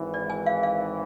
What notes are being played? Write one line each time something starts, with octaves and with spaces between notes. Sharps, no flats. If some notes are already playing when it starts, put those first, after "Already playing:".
Already playing: G#1 G#2 E3
D5
G#5
F5
F5